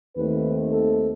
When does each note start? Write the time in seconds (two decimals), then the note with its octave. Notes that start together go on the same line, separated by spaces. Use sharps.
0.17 D#2 D#3 A3 C4 B4
0.71 A4